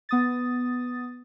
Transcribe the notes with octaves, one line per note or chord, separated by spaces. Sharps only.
B3 D#6 A6